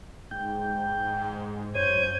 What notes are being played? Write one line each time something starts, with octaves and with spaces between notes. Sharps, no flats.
G#2 G5
F#2 C5 C#5 G6 G#6 D#7